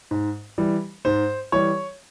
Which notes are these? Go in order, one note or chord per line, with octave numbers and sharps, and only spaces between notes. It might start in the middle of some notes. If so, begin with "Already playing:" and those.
G#2
E3 G3
G#2 C5
E3 G3 C#5